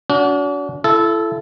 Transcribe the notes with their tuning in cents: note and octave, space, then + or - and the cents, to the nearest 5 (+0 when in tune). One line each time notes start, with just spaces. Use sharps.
D4 -45 F#4 +0
E4 +35 A4 -15